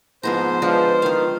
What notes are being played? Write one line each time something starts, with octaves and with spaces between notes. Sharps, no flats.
G#2 F3 B3 C5 A#5
F3 G#3 D4 B4
D#3 F4 F5